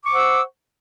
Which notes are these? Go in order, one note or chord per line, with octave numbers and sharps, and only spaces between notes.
C5 F#5 C#6 D6 E6